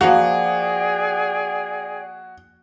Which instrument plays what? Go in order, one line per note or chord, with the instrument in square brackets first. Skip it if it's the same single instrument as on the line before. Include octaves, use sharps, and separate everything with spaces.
[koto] F3 A#3 [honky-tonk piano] F#4 [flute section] G#4 D5 G5 [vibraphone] F#5